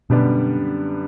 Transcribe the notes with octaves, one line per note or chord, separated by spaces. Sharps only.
F#2 B2 D3 G3 B3 D4